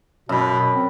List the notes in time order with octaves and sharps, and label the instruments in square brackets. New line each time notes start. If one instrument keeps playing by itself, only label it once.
[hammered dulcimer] F#2 B5 [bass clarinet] B2
[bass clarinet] C4